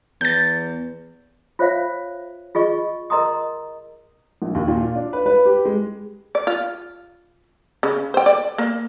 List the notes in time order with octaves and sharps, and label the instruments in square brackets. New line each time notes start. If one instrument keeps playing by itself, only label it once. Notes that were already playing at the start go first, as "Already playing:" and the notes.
[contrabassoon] E2 [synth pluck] G6 A6
[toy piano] F4 C5 C#5 E5 F5
F4 G#4 D#5 C#6
A#4 D#5 A#5 C6 D#6
[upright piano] A#1
D#2
A#2
F4
D4
B4
B4
G4
G#3
[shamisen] D5
F4
C#3
C5 G5
D5
A#3